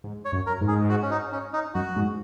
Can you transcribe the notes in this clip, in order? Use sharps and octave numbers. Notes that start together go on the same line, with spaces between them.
G#2
C#5
F#2
A#4
G#2
G#4
F#4
C#4
D#4
C#4
D#4
F#2 F#4
G#2